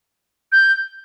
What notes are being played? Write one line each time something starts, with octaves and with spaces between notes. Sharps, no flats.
G6